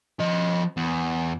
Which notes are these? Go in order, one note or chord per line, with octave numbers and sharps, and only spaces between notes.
F3 D#5
E2